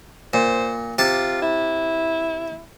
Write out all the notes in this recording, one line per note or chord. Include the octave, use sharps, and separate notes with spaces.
A#2 C5
C3 F4 A5 D6
E4